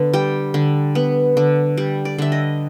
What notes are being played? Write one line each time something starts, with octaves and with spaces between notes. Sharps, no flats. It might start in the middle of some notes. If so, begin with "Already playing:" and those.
Already playing: D3 B3
G3 G5
D3
B3
D3
G3
D5
D3 E5
D#5